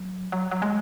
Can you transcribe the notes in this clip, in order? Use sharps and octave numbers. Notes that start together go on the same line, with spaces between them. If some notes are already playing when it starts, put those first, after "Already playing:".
Already playing: F#3
F#3
F#3
G#3